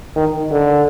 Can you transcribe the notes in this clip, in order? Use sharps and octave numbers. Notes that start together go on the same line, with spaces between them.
D#3
D3